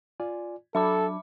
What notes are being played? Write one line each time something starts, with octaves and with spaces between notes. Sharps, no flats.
F4 D5 G#5
F#3 D4 A4 E5 A5 B5 D6